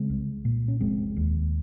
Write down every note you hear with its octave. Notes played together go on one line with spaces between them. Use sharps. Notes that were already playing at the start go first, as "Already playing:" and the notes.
Already playing: C#3 G#3 C4
C2
A#2
C#4
F1 G#3 C4
D#2